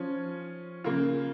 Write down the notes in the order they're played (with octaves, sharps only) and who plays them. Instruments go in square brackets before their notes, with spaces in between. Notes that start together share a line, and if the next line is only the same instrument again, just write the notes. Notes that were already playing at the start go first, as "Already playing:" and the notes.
Already playing: [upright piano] F3 C#4
C#3 A#3 F4